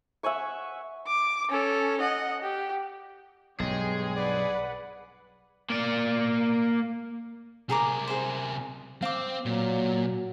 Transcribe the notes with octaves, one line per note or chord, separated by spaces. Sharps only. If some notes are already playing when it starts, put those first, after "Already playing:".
E5 F#5 G#5 C#6
D6
C#4 A4
D#5 F#5
G4
B1 G2 G#3 G#4 C#5 G5
B4 D5 F#5
A#3 D5
C3 G#4 A#4 A#5 D6
G#4 C5
C4 F5 D6
A#2 F#3